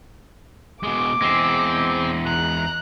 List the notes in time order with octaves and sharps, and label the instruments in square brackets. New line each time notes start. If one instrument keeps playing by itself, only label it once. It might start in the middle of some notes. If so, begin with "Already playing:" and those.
[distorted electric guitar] B2 G#3 [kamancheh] D6
[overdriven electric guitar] E2 G#3 [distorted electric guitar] C4
[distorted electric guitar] A#5 [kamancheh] F#6